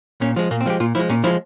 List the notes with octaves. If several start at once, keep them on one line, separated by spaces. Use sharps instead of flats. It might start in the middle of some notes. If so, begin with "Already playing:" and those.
A#2 C#4
F3 G#3
A#2 A#3
C4
F3 G#3 G4
A#2 F4
F3 G#3 E4
A#2 C#4
F3 G#3 E4